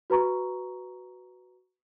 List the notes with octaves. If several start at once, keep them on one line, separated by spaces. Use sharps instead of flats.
F#4 B4 A#5 C#6